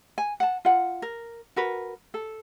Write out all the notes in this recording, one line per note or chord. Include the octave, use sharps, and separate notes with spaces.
G#5
F#5 A5
F4 F#5
A#4
F#4 A#4 B4
A4